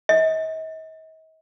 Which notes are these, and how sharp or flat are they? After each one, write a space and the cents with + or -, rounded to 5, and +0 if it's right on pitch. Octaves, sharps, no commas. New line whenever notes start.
D#5 +45